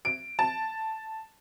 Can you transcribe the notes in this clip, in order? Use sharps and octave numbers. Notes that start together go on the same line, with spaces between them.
D7
A5